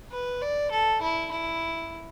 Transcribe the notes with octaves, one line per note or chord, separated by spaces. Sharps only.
B4
D5
A4
E4
E4